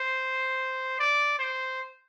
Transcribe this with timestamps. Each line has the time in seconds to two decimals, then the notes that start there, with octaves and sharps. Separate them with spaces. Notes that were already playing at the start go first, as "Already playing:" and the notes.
Already playing: C5
0.99 D5
1.39 C5